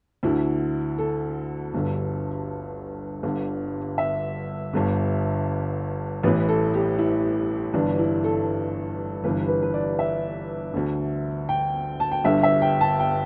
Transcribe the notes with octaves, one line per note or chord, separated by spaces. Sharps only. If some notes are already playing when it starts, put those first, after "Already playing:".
D2 D3 E4
A4
G1 G2 D3
G1 G2 D3
E5
G1 G2 D3
A1 A2 E3 B4
A4
G4
E4
G1 G2 E3 D4
E4
A4
G1 G2 E3 B4
B4
B4
D5
E5
D2 D3
G5
A5
G5
G1 G2 D3 E5
E5
G5
A5
G5